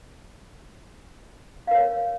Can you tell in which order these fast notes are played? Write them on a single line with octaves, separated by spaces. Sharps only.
F5 A#4 C#5